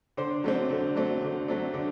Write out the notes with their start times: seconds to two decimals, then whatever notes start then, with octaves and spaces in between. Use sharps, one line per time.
0.17 D3 C5
0.44 F#3 A3 C4
0.70 D3
0.96 F#3 A3 C4
1.22 D3
1.48 F#3 A3 C4
1.74 D3